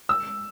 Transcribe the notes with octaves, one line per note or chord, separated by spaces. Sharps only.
E6